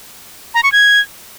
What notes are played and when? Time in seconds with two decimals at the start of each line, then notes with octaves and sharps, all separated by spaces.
0.54 A#5
0.63 C#6
0.72 G#6